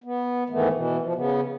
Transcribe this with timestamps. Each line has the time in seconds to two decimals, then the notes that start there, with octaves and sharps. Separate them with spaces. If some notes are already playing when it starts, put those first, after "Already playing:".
0.04 B3
0.50 G#2 D#3 E3 A3 B3
0.73 B2 E3
1.02 F3
1.15 C#3 B3